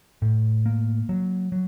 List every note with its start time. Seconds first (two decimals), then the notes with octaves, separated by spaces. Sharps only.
0.22 A2
0.66 A#3
1.09 F#3
1.52 F#3